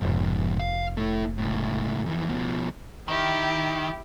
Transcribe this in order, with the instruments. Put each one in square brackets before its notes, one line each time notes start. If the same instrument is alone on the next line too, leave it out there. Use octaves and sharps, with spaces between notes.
[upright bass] F1 [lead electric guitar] G#2 F3
[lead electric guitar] F5
A3 E4
C#2 A2
F2 E3
[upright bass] C#2 [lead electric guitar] B2 F3
[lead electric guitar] D#3 [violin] E4 G4